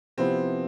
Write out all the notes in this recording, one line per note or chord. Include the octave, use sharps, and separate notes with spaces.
C3 F3 B3 C4 E4 G4